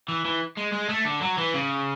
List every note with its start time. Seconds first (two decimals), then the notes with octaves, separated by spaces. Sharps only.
0.08 E3
0.25 E3
0.57 G#3
0.73 G#3
0.89 A3
1.05 D3
1.21 F#3
1.38 E3
1.54 C#3